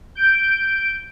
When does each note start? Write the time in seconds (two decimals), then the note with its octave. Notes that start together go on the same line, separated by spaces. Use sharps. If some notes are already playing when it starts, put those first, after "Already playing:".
0.15 G6 D7